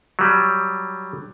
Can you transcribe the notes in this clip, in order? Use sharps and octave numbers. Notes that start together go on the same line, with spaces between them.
F#3 G3